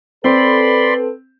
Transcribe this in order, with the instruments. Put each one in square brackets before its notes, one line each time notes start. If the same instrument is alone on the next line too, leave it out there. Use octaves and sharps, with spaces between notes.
[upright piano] C4 [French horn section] A4 B4 [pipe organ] D5 B5 C6